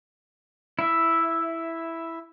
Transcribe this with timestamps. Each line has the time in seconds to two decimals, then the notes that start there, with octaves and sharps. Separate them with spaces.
0.79 E4 E5